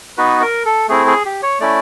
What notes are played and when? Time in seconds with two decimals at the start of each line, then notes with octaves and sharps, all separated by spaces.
0.17 B3 D#4 F#4 B4
0.42 A#4
0.65 A4
0.88 A3 C4 E4 G#4
1.07 G#4
1.25 G4
1.42 C#5
1.60 A3 C#4 E4 D5